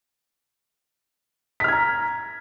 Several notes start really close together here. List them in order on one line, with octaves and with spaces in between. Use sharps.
B6 F6 G#6 A#5